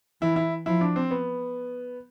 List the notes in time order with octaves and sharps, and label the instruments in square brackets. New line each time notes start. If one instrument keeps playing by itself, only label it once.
[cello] E3 [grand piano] E4
[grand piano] E4
[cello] F3 [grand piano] E4
[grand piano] D4
C4
B3